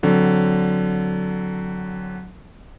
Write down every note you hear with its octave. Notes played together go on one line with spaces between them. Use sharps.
D3 F#3 C4